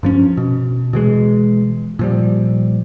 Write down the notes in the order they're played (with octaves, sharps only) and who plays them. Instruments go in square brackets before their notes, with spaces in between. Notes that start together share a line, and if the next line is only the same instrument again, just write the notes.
[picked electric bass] G2 F3 C#4
B2
B2 E3 G#3
A#2 F3 G3